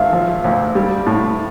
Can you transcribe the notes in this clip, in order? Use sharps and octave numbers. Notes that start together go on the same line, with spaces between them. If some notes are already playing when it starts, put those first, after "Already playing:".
Already playing: G#1 E5 F5
F3
D2
G3
A2